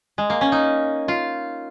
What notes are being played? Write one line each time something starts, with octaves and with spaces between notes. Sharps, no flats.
G#3
A#3
C#4
D#4
F4